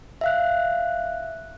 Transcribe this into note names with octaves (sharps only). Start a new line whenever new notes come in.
E5 F5 F#6